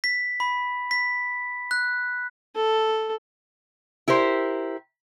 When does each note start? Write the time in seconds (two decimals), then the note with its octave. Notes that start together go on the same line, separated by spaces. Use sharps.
0.04 B6
0.40 B5
0.91 B6
1.71 F#6
2.56 A4
4.08 E4 G4 A#4 C5